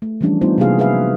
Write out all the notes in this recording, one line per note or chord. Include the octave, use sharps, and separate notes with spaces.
A3
E3 F3 G3 C#4 D4
G3 A3 B3 D#4 F4 C5
C3 F#3 A#3 F#4 G#4 F5
G#4 B4 E5 F5